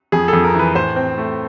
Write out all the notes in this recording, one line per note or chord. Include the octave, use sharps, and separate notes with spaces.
F2 G#4
A4
F2
A#4
E3 B4
A2 C5
C4
A3